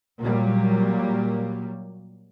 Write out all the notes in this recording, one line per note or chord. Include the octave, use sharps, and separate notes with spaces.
A#2 F#3 G3 A#3